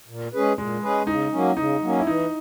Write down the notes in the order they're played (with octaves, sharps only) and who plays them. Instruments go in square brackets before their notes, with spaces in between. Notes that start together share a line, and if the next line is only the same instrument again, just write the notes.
[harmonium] A#2
G#3 C#4 G#4 B4
[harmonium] A#2 [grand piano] G#3
[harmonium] G#3 C#4 G#4 B4
[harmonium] C#3 [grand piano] D#4
[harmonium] F#3 A#3 C#4
[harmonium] C#3 [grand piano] D#4
[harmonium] F#3 A#3 C#4
[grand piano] E4
[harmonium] E3 [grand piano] D#4